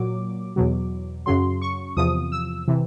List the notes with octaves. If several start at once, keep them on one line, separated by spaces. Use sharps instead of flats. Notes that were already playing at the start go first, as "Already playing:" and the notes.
Already playing: A#2 F#3 D6
E2 B2 F#3
F#2 C#3 F#3 C6
C#6
E2 C3 F3 D#6
E6
C3 E3